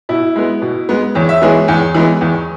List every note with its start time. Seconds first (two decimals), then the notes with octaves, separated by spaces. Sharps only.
0.09 B2 E4
0.36 G#3 B3
0.62 B2
0.89 G#3 B3
1.15 E2 C#5
1.29 E5
1.42 E3 G#3 B3 G#4 C#5
1.68 E2
1.94 E3 G#3 B3
2.21 E2